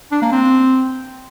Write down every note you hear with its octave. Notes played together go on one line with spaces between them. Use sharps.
D4
A#3
C4